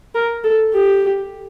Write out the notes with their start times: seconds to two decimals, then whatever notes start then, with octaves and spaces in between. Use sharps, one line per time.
0.15 A#4
0.44 A4
0.73 G4